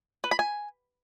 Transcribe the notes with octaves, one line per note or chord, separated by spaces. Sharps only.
B4
B5
G#5